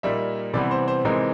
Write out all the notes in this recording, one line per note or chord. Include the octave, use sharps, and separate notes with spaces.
A#2 G3 A#3 D#4 E5
C3 E3 G3 B3 D5
C5
C5
C3 E3 G#3 C4 D#4 A#4